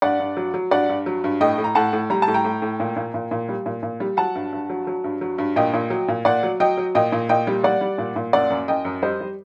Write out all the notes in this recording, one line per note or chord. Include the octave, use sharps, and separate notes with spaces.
G2 D5 F#5
G2
F#3
F#3
G2 D5 F#5
G2
F#3
G2
A2 D#5 G5
A2
A#5
A2 F#5 A5
A2
G3 A#5
A5
A2
G5 A#5
A2
A2
A#2
A#2
A#2
A#2
G3
A#2
A#2
G3
F#3 F#5 A5
G2
G2
F#3
F#3
G2
F#3
G2
A#2 D#5 G5
A#2
F#3
A#2
A#2 D5 F#5
F#3
F#3 D#5 G5
F#3
A#2 D#5 G5
A#2
A#2 D#5 G5
G3
G3 D5 F#5
G3
A#2
A#2
F#2 D5 F#5
F#2
F#2 D#5 G5
F#2
G3 C5 D#5
G3